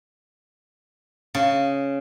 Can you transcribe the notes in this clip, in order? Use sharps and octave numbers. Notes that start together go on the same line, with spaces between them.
C#3